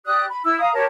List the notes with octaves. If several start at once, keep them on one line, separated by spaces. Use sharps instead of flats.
G4 D5 D#6 F#6
B5
E4 E6
F5 A#5 D#6
G4 A#4 C#5 A5